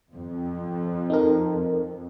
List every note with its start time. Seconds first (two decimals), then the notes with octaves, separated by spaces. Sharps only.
0.14 F2
1.10 D#4 A4 A#4